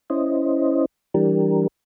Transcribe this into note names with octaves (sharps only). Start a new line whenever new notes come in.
C#4 E4 C5 D#5
E3 G3 D4 G4 A#4